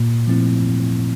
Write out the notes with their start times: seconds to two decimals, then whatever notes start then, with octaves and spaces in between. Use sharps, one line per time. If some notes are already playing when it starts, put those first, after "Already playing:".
Already playing: A#2
0.27 F3 A3 C4 E4